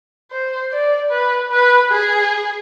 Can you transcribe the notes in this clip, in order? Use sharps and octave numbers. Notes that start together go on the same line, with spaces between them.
C5
D5
B4
B4
G#4